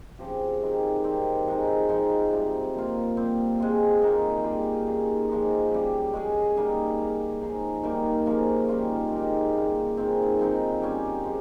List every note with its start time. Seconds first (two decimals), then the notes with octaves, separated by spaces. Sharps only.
0.19 C#3 F3 C4 G4
0.62 D#3 G#3 C4 G4
1.04 D#3 G3 C4
1.47 F3 G#3 D#4
1.89 F3 C4 D#4
2.32 C3 G3 C4 F4
2.74 A#2 F3 A#3 F4
3.17 A#2 G3 C4
3.59 G#3 C4 F4 G#4
4.02 D#3 A#3 D#4 G#4
4.43 G3 A#3 F4 G#4
4.87 D#3 G3 C#4 G#4
5.29 F3 G#3 D#4 G4
5.72 C#3 G3 C#4 G4
6.13 G#3 C#4 G#4
6.56 G3 A#3 D#4 G#4
6.98 C#3 G3 A#3
7.41 F3 G#3 D#4 G#4
7.83 D#3 G3 A#3
8.26 C#3 F3 A#3 C#4
8.69 D#3 G3 C#4 F4
9.12 G#3 C4 D#4 G4
9.54 C#3 G3 A#3 F4
9.97 D#3 G#3 C4 F4
10.39 F3 G#3 C4 D#4
10.81 G3 C#4 G4
11.24 F3 G#3